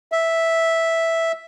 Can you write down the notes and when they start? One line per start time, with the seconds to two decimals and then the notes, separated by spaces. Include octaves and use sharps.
0.12 E5